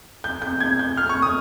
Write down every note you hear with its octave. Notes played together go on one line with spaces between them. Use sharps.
G6
G6
G#6
G6
F6
C#6
D#6